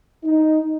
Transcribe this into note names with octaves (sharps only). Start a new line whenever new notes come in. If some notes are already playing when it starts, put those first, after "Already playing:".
D#4